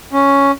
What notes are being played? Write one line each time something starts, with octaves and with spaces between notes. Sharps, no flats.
C#4